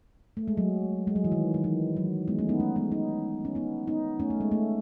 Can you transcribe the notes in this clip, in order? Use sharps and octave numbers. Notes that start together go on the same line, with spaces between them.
A3
G#3
F#3
G#3
F#3
E3
D#3
D#3
E3
F#3
G#3 B3
A3 C#4
B3 D#4
A3 C#4
G#3 B3
B3 D#4
C#4
B3 D#4
B3 D#4
A3 C#4
A3
G#3
A3